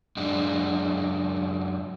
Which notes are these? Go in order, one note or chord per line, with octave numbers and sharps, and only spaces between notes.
F#2 G#3 D4